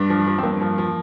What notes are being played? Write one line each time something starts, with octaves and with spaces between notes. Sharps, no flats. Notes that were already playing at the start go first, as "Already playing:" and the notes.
Already playing: G2 D4
F3
F3
C4
G2 A#3
F3
F3